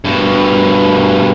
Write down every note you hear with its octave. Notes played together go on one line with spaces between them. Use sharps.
G2 B2